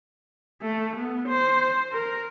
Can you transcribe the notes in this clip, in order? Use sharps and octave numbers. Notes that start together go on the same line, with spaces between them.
A3
B3
C5
A#4